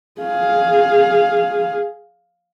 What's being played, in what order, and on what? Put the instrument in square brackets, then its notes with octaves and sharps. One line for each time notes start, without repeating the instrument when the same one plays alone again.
[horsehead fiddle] G#4 F5